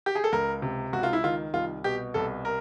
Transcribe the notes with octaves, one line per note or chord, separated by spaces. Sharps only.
G4
G#4
A4
C#2 A#4
C3
C#2 F#4
F4
E4
D#3 F4
C2 F4
B2 G4
C2 A4
A#4